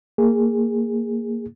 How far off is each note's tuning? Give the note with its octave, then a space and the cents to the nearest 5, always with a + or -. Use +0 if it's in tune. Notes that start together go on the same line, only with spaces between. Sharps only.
A#3 -10 G#4 -15